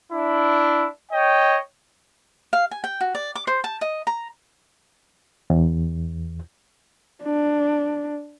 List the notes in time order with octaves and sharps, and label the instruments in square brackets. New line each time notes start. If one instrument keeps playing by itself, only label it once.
[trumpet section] D4 E4
C#5 D#5 G5
[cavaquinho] F5
G#5
G5
F#4
D5
D6
C5
A5
D#5
A#5
[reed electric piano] E2
[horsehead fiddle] D4